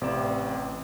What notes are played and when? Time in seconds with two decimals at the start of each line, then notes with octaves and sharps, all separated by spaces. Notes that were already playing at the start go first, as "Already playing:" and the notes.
0.01 A1 C3 B4 D5 D6 E7